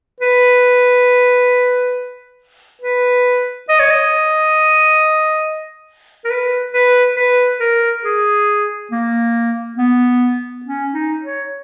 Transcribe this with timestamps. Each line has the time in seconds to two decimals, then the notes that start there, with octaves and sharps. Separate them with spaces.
0.21 B4
2.82 B4
3.69 D#5
3.80 C#5
3.91 D#5
6.24 A#4
6.30 B4
6.73 B4
7.16 B4
7.60 A#4
8.05 G#4
8.91 A#3
9.78 B3
10.65 C#4
10.93 D#4
11.23 C#5